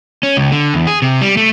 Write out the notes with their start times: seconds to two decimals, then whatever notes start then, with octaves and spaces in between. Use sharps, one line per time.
0.23 C#4
0.37 C#2
0.52 D3
0.74 E2
0.87 G#4
1.02 C3
1.21 G3
1.37 A3